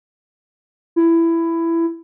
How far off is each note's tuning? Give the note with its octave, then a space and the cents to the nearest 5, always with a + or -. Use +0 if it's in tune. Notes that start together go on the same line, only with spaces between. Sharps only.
E4 +15